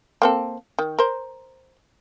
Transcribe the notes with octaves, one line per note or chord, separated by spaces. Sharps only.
A#3 C4 A4
D#3
A#4 C5